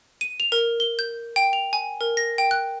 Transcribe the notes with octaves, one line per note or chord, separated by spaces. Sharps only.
D#7
F7
A#4
G7
G6
G5
F7
G#5
A#4
A#6
G5
F#6